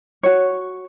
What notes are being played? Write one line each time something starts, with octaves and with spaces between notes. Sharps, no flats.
F#4 C#5